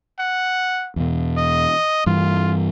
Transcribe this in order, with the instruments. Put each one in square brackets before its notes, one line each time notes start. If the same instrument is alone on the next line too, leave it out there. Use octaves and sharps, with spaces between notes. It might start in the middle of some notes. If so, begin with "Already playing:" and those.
[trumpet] F#5
[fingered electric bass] E2 B2
[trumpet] D#5
[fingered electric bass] G2 E3 [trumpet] F4